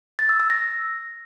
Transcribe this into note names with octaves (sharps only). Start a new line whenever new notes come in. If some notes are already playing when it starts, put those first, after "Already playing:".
A6
E6
E6
A#6